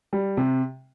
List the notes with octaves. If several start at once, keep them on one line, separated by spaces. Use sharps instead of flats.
G3
C3